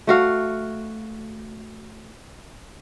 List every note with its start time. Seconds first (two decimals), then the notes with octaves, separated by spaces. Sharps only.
0.07 A3 F#4 F5